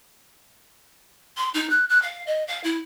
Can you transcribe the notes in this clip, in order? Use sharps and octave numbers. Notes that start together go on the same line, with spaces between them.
C6
D#4
F#6
F#6
F5
D#5
F5
E4